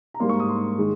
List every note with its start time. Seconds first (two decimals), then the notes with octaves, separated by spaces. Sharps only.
0.14 A#5
0.20 G#2 G3 A#3 C6
0.29 C#6
0.39 D#6
0.49 C6
0.78 D#3 G#3